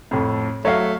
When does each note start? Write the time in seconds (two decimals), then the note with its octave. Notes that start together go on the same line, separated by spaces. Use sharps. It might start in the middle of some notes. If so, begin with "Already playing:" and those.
0.11 F2 A2
0.65 F#3 A3 C#5 F5